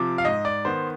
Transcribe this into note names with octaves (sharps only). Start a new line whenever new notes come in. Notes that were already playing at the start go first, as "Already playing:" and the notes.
Already playing: C3 F3 D6
F5
G#2 D#5
D5
D#3 B3 C5